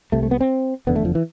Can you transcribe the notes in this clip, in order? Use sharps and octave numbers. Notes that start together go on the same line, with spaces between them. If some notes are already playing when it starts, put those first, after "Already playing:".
C2 C3 A3
A3
B3
C4
F1 E2 D3 B3
A3
F3
E3